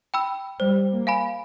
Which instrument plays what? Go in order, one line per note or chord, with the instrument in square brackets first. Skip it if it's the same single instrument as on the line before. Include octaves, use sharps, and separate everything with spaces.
[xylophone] G5 B5 E6
[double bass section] G3 [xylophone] C5
[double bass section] A#3
[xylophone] F5 G#5 B5